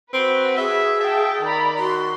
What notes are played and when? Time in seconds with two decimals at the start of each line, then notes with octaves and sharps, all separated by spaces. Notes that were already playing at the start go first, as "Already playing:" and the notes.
0.13 C4 F#4 B4
0.57 G#4 E5
1.00 E5 F5 G5 A5
1.41 D#3 D5 A#5 B5
1.78 F#4 C6